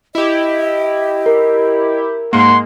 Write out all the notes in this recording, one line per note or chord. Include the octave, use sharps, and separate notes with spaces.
E4 G4 D#5
A#4
G#2 G#3 A#3 F#5 C6